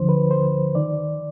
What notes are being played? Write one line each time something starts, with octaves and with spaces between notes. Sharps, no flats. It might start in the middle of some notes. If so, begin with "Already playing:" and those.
Already playing: D2 D3 F3 C5
B4
C5
D#3 D5